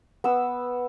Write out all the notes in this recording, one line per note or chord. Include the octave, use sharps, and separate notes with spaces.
B3 E6